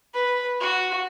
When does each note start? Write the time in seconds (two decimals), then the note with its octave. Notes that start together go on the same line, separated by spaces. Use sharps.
0.14 B4
0.61 F#4